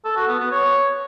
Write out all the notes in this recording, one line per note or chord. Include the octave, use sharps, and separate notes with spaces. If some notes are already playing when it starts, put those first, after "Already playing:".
A4
F#4
B3
B3
C#5